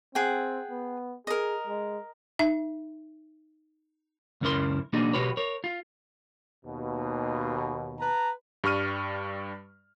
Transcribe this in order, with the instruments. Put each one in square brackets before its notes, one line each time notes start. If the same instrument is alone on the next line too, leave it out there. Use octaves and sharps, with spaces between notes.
[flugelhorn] C4 [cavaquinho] G#4 F#5 G5
[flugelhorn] B3
[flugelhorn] G#4 [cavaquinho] A#4 D#5
[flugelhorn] G#3
[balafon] D#4 E5
[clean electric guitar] C#2 F#2 C#4 E4 A#4 C6
B1 A#3 D4 D#4 F#4 G#4
B1 B2 F#4 G4 B4 C#5
A#4 C#5
F4
[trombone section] D#2 B2
[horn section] B4 A5 A#5
[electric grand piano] G2 G3 C#6 F6 D#7